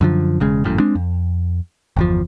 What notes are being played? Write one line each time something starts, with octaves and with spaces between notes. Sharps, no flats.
F#2 D3 F3
E1 C#3 G#3
G#1 F#2 A2
G#3 C4 D4
F2
G1 E2 F3